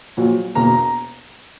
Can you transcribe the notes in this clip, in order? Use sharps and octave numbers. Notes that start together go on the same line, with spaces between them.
A#1 A#2 F#3
E1 E2 B2 A#3 A#5
A#5